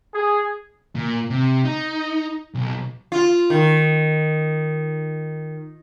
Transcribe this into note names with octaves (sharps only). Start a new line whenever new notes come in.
G#4
A#2
C3
D#4
B1
F4
D#3